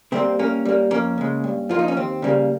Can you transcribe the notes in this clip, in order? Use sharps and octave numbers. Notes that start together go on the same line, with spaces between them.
C3 G3 A#3 C4
G2 A#3 C#4
G3 A#3
F2 A#3 C#4
C#3 G#3
G2
F3 A#3 F4
D#4
C#4
D#2 C4
C#3 G3 A#3